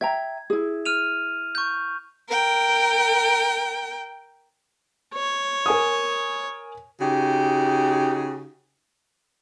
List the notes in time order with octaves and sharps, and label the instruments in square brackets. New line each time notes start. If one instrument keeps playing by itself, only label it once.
[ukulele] E5 G5 A#5 [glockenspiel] G#6
[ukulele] E4 G#4
[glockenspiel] F6 D#7 F7
C#6 G6
[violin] A#4 G5
[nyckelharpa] C#5
[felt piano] A#4 G#5 D#6
[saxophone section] C#3 D#4 F#4 G4